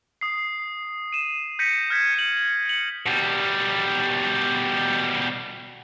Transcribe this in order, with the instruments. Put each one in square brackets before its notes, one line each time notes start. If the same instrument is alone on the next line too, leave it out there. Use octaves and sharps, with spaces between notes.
[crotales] D#6 C7
D#7 E7
G6 A#6 B6 C#7 D#7
F6 G6 G#6 B6
C#7 F#7
C#7 F#7
[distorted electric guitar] B2 G3